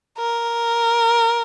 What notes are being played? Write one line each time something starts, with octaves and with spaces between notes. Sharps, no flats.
A#4